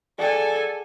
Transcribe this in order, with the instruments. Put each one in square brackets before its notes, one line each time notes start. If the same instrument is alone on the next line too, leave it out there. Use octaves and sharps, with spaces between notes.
[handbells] G#4 D5 F#5 [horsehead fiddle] A4 G#5